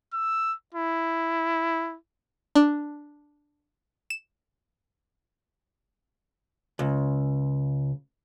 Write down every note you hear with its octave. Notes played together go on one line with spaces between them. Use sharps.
E6
E4
D4
E7
C#2